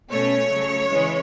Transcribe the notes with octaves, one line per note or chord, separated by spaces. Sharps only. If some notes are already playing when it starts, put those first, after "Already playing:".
B2 A3 C#4 C#5
C#3 F#3 A3
C#3 E3 G#3 C#4